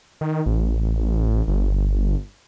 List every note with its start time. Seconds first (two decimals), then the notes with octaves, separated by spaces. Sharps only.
0.21 D#3
0.46 A1
1.48 G1